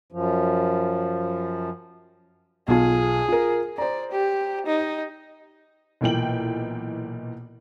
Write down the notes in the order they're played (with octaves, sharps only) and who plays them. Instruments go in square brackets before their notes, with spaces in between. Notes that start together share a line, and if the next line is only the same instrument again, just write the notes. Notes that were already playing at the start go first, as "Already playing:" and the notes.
[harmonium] F#2 F3
[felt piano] B1 F4 [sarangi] G#4
[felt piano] F4 A#4
[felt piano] C5 A#5 [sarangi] D5
[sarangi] G4
D#4
[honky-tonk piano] B1 A#2 E3 G5 F#7